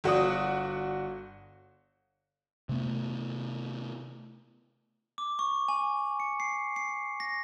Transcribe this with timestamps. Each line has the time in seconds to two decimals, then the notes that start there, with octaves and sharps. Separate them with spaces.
0.04 G1 F#4 D5 D#6
2.69 C3 A3 B3
5.18 D6
5.39 C#6
5.68 G#5
6.20 C#7
6.40 C7
6.76 C7
7.20 A#6